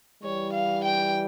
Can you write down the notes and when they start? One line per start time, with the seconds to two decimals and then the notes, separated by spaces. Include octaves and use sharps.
0.23 E3 G3 C#5
0.54 F5
0.84 G5